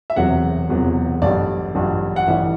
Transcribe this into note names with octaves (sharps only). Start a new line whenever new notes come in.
E5
E1 E2 C3 F#3 F#5
E1 E2 C3 F#3
A1 G2 F#3 D5
A1 G2 F#3
F#5
A1 G2 E3 E5